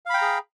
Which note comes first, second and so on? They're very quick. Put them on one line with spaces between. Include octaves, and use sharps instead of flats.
F5 B5 G5 A#5 G#4